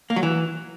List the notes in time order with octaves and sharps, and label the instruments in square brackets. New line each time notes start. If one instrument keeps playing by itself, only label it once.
[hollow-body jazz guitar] A#3
F#3
E3